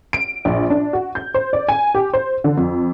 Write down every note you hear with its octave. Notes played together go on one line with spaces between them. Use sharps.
D7
A#1
D4
F#4
G6
C5
D5
G#5
G4
C5
D3
F2